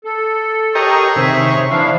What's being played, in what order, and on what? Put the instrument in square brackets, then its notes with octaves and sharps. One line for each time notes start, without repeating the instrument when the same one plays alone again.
[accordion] A4
[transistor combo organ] G4 A#4 D#5 [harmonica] G#4 C#5
[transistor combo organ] C3 D#3 [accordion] E5
[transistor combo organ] E3 [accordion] F3 D4 F5